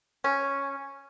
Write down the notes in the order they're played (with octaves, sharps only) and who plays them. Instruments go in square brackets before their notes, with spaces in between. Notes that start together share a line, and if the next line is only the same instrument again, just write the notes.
[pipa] C#4